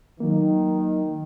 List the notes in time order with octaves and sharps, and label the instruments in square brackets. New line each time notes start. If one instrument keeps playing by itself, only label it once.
[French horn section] D#3 [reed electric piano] F#3 A#3